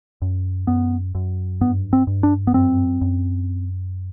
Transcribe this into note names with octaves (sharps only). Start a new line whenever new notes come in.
F#2
F#2 B3
F#2
G2 B3
C4
G2
D4
B3
F#2 C4
F#2